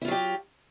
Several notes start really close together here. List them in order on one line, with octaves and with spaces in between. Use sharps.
E4 F4 F#3 G4